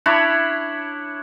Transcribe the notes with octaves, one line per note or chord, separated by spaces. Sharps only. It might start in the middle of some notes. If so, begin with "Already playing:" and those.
D4 E4 C#5 B5